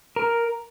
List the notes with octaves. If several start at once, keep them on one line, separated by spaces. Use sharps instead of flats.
A#4